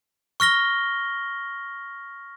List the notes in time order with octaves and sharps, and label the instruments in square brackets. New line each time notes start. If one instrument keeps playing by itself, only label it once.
[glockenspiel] C#6 F6 A#6 G7